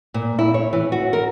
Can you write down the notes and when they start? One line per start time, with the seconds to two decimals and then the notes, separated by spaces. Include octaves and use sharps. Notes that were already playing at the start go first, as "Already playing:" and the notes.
0.14 A#2
0.39 E4
0.54 C#5
0.73 E3
0.92 F#4
1.13 A#4